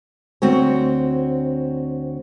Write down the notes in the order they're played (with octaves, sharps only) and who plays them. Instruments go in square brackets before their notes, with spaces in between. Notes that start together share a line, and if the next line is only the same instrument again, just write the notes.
[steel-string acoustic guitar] D2 C4 F#4 C#5